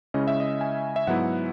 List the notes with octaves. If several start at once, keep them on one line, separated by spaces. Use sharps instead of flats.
C#3 G#3 C#4 E4 D#5
E5
D#5
G#5
E5
G#2 F#3 B3 E4 F#5